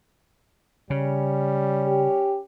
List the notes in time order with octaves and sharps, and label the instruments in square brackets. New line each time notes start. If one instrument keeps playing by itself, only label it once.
[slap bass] C#3 [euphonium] G3 [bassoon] C#4
[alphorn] G4